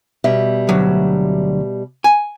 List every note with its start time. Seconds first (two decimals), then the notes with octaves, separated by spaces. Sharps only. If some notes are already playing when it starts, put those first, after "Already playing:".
0.24 B2 G3 E5
0.69 D2 F#3
2.04 G#5